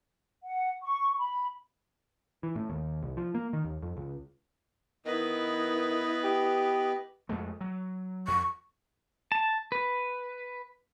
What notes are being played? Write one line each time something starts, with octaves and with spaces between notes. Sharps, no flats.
F#5
C#6
B5
E3
A2
D#2
C2
F3
A#3
D#3
D#2
F2
C#2
D#3 B3 E4 B4 D#5
G4
F2 G#3 A3
F#3
F2 C#6
A5
B4